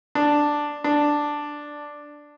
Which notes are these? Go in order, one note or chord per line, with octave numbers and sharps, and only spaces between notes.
D4
D4